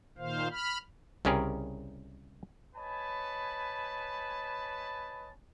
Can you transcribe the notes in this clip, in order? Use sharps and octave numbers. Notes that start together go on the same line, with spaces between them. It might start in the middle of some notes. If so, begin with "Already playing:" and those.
A#2 D#3 C5 F5
B5 F6
C2 C#3 C#4 G4 G#4 A#4
B4 C#5 D#5 G#5 A5 B5